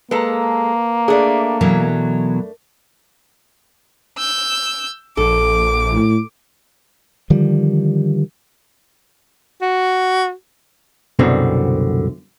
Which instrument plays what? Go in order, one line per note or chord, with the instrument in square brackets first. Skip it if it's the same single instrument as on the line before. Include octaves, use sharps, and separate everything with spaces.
[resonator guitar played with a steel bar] G#3 A4 [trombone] A#3 [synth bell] B4 A5 A#5
[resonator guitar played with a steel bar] A3 D4 [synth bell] G#4 D5
[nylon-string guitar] B2 E3 F#3 [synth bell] A#4
[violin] E6 G6
[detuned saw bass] A#1 [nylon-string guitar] A4 [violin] D6
[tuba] A2
[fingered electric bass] D3 D#3 F3 G3
[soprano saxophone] F#4
[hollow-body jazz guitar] C2 F#2 B2 D3 C4 F#4